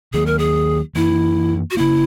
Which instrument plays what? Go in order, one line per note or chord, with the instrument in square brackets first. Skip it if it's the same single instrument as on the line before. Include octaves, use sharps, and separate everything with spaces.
[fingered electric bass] D#2 D#3 F#3 A#3 [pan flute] G#4
[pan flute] A#4
G#4
[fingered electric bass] F#2 E3 A#3 [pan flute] E4
[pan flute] F#4
[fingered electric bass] C#3 E3 A#3 [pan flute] E4